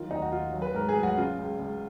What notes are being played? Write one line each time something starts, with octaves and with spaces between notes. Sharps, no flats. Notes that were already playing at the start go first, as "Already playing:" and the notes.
Already playing: D#3 F#3 F4
D#2 D#4
F#4
D#2 F4
F#3
B4
G#2 A#4
G#4
F#3
F#4
C#3 F4
C#2
C#2